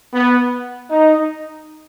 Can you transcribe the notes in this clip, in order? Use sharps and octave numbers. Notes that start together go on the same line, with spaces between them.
B3
D#4